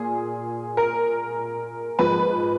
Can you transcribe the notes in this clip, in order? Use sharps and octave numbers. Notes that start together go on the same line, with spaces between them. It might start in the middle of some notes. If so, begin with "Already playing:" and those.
Already playing: A#2 G#4
A#4
G#2 F3 B4